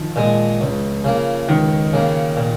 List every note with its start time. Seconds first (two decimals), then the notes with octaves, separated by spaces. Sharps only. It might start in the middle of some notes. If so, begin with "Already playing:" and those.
Already playing: D#3 F3
0.16 A#2 G#3
0.61 C#2
1.04 C#3 A#3
1.48 C#2 D#3
1.93 C#3 A#3
2.37 A#2